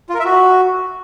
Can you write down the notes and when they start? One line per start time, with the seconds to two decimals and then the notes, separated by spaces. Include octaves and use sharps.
0.09 F4
0.15 A#4
0.20 E5
0.25 F#4